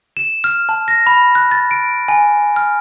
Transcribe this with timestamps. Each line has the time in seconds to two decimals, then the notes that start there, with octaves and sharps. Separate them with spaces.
0.17 E7
0.44 F6
0.69 A5
0.88 A#6
1.07 B5
1.35 F#6
1.51 A6
1.71 D7
2.08 G#5
2.56 F6